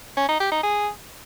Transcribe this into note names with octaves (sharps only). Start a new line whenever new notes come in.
C#4
D#4
G4
D#4
G#4